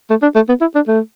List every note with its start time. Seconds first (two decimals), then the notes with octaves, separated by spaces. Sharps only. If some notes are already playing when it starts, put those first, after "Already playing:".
0.10 A3
0.22 D4
0.35 A3
0.49 B3
0.61 E4
0.75 D4
0.88 A3